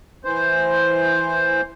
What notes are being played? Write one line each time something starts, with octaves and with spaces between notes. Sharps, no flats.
E3 C5